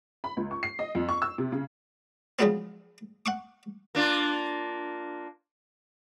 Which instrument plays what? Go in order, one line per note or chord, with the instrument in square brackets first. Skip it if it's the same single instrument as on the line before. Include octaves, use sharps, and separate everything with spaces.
[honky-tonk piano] B5
C#2
C#6
C7
D#5
F2
C#6
E6
C3
C#3
[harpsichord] C#3 F3 F#3 G#3 B3 C4
F#5 C#6 D6
[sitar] A#3 D4 F4